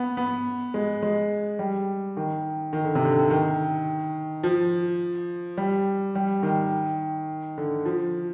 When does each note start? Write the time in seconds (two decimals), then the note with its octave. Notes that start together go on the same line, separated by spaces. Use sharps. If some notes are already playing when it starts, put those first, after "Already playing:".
Already playing: B3
0.17 B3
0.74 G#3
1.03 G#3
1.59 G3
2.17 D#3
2.73 D#3
2.85 D3
2.95 C3
3.05 D3
3.30 D#3
4.43 F3
5.57 G3
6.15 G3
6.43 D#3
7.58 D3
7.85 F3